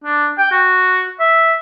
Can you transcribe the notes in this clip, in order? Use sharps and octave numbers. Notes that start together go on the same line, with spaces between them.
D4
G5
F#4
E5